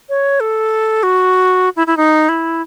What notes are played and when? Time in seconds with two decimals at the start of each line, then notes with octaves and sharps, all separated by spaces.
0.09 C#5
0.40 A4
1.03 F#4
1.76 E4
1.87 E4
1.97 D#4
2.29 E4